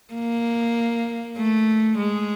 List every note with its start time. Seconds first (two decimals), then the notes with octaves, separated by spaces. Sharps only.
0.14 A#3
1.37 A3
1.98 G#3